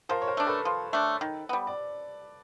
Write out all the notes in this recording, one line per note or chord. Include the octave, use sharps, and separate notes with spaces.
F3 A#4 C5
C#5
A#4 C5
A3 D4
A4 B4
F3
A3 D4
D#3
G3 B3
D5